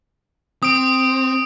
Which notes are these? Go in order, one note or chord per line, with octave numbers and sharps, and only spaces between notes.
C4 D#6 D7